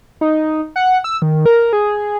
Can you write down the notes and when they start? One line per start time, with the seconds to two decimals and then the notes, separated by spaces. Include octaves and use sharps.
0.21 D#4
0.76 F#5
1.04 E6
1.22 D#3
1.46 A#4
1.73 G#4